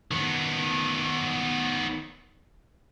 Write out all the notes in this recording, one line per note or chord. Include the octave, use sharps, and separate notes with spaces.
D#3 B3